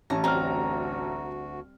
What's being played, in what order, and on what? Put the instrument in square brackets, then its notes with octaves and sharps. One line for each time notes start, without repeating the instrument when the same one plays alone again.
[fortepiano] A1 C#4 A5 [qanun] A#5
[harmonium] D2 F#4 [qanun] G3 C4 [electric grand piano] A#5 F6